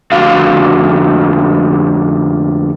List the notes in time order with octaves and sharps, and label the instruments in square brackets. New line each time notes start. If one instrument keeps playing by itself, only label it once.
[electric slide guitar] F2 D3 A3 F#4 F5